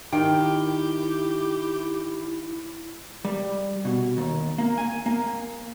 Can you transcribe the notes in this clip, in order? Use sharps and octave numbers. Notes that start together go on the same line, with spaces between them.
D#3 E4 G4 A#4 F5 G5
G3
B2
D#2
A#3
G#5
A#3